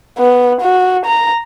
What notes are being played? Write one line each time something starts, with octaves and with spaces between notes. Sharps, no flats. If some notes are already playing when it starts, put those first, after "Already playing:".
B3
F#4
A#5